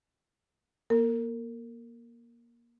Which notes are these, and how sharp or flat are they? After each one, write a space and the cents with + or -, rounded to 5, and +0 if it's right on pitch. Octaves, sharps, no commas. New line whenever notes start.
A#3 +20 A#4 -30